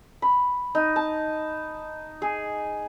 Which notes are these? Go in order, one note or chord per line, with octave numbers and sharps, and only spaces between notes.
B5
D#4
A5
G#4